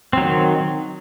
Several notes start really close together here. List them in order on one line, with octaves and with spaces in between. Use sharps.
C4 F#3 D#3